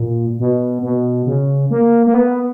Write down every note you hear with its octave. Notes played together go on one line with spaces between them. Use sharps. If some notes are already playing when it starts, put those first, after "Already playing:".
Already playing: A#2
B2
B2
C#3
A#3
A#3
B3